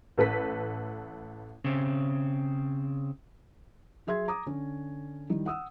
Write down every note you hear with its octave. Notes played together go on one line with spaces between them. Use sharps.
A1 A4 B4 B6
C#3 C4
F#3 G#4 E5 C6 G#6
A#5 D6 D#6
D3 C#4
D#3 G3 D#4 E4
F#5 D#6 E6